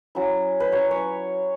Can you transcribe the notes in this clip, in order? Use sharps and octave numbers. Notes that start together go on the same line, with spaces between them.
F#3 C#4 E4
B4
F#3 C#4 E4 C#5
C#5